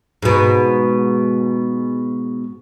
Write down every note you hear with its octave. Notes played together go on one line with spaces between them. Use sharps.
G#2 B2